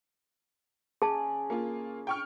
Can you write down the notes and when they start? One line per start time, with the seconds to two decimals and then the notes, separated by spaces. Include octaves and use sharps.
1.02 C#3 G#4 D5 G#5 A5
1.50 A#3 F4
2.07 G5 C#6 F6